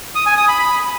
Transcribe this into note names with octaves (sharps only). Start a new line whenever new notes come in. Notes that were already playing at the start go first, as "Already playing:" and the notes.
D#6
G#5
D#6
B5
B5